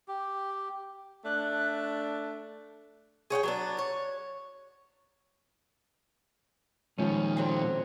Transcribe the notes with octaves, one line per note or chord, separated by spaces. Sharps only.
G4
A3 D4 F#6
G#4 C#5 F#5 G5
F#3 B3 D4
C#5
A#2 D#3 F3 G#3 C#4
D3 F#3 C4